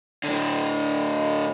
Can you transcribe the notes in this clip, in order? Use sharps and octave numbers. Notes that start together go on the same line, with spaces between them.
A2 D3